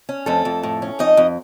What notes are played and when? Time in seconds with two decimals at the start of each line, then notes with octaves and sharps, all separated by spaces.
0.09 C#4
0.26 F2 A3 A4
0.45 F2
0.63 A2
0.82 C#4
0.99 F2 D#4 D#5
1.17 F2